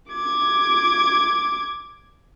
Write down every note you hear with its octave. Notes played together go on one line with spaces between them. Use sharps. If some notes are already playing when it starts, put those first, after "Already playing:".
D6 G#6